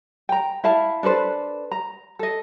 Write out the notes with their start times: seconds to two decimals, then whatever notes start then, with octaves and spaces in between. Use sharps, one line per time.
0.29 G5 A#5
0.64 E4 E5 F5 A5
1.03 D4 A4 B4 C5
1.71 A#5
2.19 A4 D#5